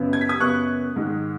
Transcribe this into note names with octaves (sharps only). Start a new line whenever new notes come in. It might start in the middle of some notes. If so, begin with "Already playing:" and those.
Already playing: F#2 C#3 B3
G#6
B6
D#6 G#6
F#2 C#3 B3 C#6 F#6
G#2 D#3 G#3